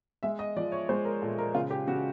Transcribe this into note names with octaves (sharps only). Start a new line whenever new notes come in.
G#3 E5
D#5
F3 D5
C#5
G#3 C5
A#4
A#2 A4
A#4
C#3 F4
G4
C#3 F#4